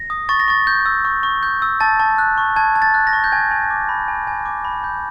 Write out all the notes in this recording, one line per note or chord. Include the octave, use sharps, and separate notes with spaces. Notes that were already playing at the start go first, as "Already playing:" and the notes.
Already playing: A#6
D#6
C#6 A6
A#6
C#6 A6
G6
E6
C#6
C#6
G6
E6
A5 A6
A5
F#6
C#6
A5 G#6
A5
A6
F#6
A#6
C#6
G6
G#5 G#6
G#5
D6
B5
G#5
G#5
D6
B5
B5 G6